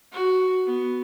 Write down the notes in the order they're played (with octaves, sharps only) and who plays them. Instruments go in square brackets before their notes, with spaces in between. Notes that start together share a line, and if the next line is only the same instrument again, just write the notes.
[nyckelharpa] F#4
B3